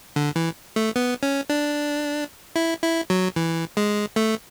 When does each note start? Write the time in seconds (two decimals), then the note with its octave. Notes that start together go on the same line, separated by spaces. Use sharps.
0.16 D3
0.36 E3
0.76 A3
0.96 B3
1.23 C#4
1.50 D4
2.56 E4
2.83 E4
3.10 F#3
3.36 E3
3.77 G#3
4.16 A3